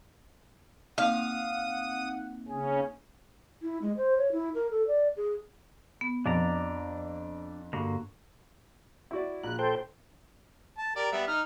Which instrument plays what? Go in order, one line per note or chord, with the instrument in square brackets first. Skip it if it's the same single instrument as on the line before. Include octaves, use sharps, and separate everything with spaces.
[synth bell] A#3 C4 D#4 [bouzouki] F5 [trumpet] F#5 [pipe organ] D#6
[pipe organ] C#3 C#4 [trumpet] G#4
[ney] E4
G#3
C5
C#5
E4
A#4
A4
D5
G#4
[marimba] B3
[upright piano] F2 [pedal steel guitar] D4 D5 A#5
[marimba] G2 [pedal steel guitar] D3 A#3 F#4
[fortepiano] E4 F#4 D5
[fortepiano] A#1 [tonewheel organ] F#6
[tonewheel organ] A4 C5 G5
[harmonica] A5
G4 A#4 D5
G3 B3 E5
D#4 F6